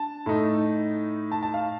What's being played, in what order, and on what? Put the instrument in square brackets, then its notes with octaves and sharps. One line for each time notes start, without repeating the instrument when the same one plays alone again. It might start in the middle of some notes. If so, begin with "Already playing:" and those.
Already playing: [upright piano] D4 A5
A2 A3 D#4
A5
A5
F5